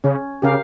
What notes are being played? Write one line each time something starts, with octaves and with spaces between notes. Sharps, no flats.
C#3 C#4
C#3 G4 A#4 F5